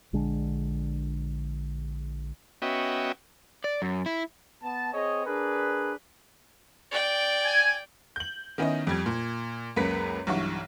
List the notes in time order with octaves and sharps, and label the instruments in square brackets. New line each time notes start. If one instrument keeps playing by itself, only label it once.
[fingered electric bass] A#1 D3 G#3 D4
[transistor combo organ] B3 C#4 F#4 D#5 E5 G5
[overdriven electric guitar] D5
F#2
E4
[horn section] B3 A5
C4 G#4 C#5 D#5
D4 G#4 A#4 B4
[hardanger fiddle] D5 G5
[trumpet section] G#5
[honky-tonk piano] G6 F#7
D#3 B3 C#4 D#4 E4 D#5
F2 G3 G#6
A#2
C#2 F#2 A#3 B4 B6 C#7
B1 G2 E3 F#5 C#6